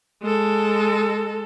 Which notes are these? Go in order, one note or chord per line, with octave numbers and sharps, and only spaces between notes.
G#3 A4